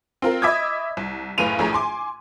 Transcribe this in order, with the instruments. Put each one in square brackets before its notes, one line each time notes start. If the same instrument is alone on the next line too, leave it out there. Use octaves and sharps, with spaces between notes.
[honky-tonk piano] C4 F4 A#4
D#5 E5 B5 D6 D#6 G#6
C2
F#1 A2 B4 F5 D#7 F7
A#1 A2 G#4 A#5
G#5 C6 D6